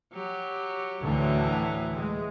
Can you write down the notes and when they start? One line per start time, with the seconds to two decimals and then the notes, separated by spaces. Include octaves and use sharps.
0.13 F#3 G4
1.02 D2 A2 D3 E3 F#3
1.93 G#3